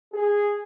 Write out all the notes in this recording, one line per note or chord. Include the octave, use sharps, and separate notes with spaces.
G#4